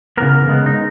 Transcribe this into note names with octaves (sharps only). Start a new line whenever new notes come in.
C#3 E3 B3 A#4
C#3 G#3 B3
D#4